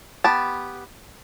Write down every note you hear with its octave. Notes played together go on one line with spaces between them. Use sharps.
B3 G4 A5